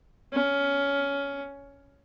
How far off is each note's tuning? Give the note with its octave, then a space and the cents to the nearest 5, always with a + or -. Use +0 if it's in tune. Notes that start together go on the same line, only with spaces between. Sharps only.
C#4 +15